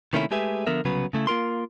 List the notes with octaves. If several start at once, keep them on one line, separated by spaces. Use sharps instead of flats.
C3 D#3 A3 A#3 C#4 E4
G#3 A3 G4 G#4 B4 E5
D3 F3 B3 A#4 E5
C2 C#3 F#3 B3 B4
C#3 A3 E4
A#3 F4 A#4 C6